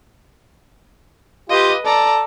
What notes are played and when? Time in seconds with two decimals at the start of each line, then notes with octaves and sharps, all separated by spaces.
1.50 F4 G4 B4 D#5
1.85 A4 D5 A#5